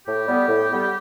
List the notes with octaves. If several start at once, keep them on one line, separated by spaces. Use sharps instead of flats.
A2 G4
G3 B3
A2
G3 B3